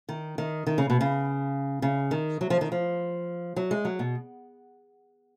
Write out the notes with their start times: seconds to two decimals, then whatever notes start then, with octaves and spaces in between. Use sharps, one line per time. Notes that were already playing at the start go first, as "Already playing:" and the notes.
0.09 D#3
0.38 D#3
0.67 D#3
0.78 C#3
0.90 B2
1.01 C#3
1.82 C#3
2.11 D#3
2.41 F#3
2.50 F3
2.61 D#3
2.72 F3
3.56 F#3
3.71 G#3
3.85 F#3
3.99 B2